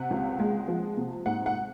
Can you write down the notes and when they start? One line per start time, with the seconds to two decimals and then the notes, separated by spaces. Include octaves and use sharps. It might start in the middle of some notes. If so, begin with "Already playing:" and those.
Already playing: C3 F#5
0.11 C#2
0.40 G#3
0.68 F3
0.97 C3
1.26 G#2 F#5
1.46 F#5